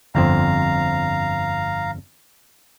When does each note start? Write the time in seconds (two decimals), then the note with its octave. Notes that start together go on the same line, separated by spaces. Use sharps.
0.15 G1 F2 C4 F5 A#5